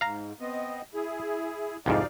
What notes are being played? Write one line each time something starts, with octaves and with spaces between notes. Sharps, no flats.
G#2 F5 A#5
B3 C4 D#5
E4 G#4
C2 F2 G#2 D#4 D5 F5